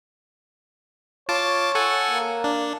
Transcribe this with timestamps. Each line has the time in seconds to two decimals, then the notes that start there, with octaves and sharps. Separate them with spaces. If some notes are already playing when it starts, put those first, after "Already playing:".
1.29 F4 C#5 A5 D6
1.75 A4 F#5 G#5
2.11 A#3
2.44 D4